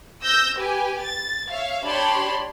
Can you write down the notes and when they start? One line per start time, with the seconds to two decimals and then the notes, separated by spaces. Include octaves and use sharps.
0.24 E6 G6 A#6
0.58 G4 B4 G#5
1.03 A6
1.50 C#5 E5 F5
1.85 D4 G4 C#5 A5 B5 C6